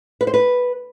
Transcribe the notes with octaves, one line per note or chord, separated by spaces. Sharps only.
B4
C5
B4